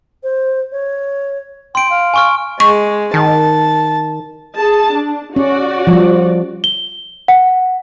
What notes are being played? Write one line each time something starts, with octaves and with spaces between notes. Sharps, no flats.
C5
C#5
G5 C6 D7
F5
G#5 C#6 F6
G#3 C#6
D#3 A5
G#4 A5
D4
C#4 F#4 D5
F3 G3
G7
F#5